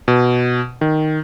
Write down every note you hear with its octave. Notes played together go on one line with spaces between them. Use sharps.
B2
D#3